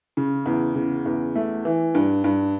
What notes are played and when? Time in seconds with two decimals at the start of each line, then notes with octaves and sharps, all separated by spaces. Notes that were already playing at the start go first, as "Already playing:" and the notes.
0.17 C#3
0.46 E2
0.75 C#3
1.06 E2
1.35 A3
1.65 E3
1.95 G2
2.24 G2